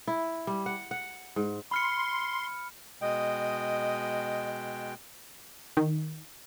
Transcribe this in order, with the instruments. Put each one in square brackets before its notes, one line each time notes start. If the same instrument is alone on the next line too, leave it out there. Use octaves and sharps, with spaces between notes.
[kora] E4
G3
F#5
F#5
G#2
[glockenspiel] B5 F6 C#7 [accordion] C6
[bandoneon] B2 G#3 G5 [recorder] D#5
[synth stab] D#3